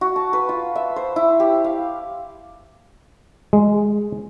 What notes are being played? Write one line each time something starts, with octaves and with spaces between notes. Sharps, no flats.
F#4
A5
B4
F4
E5
C5
E4
G4
F5
G#3